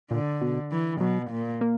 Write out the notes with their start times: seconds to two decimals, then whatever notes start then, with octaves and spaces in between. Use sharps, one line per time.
0.11 A#2 D3
0.41 B2
0.72 E3
1.01 B2 F#3
1.31 A#2
1.61 A#3